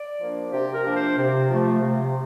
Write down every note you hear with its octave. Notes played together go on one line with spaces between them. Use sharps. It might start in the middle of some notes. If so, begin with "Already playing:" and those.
Already playing: D5
F3 A#3 D4
C3 G4
A#4
F3 A#3 D4
C5
C3
F3 A3
C3